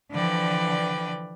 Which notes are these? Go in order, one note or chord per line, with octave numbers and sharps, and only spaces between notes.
D3 E3 F3 B4 D5 G5